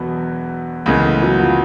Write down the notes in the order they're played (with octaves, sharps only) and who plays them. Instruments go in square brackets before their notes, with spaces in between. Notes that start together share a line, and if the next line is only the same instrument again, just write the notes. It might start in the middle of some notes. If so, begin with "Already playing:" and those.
Already playing: [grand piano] E1 E2 B2 F#3 B3
[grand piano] C#2 C#3 E3 G#3 B3 [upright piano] A#3
[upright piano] A3
F#3
F3